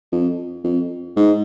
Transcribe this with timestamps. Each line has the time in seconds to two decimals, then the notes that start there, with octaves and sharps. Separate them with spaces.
0.12 F2
0.64 F2
1.16 G#2